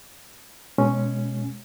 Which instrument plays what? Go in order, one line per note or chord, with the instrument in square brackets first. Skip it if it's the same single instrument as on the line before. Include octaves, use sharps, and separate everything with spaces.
[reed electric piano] B2 G#3 C#4